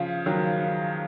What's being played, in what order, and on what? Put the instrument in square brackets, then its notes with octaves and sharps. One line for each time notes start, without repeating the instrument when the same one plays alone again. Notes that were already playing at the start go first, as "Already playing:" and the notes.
Already playing: [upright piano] C#3 F3
D#3 F#3